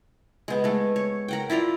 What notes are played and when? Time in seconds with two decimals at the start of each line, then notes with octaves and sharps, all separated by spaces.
0.48 G#3 B3
0.64 G#3 A3
0.96 C#5
1.28 A#4 F#5 G5
1.50 E4 F4 D5 A#5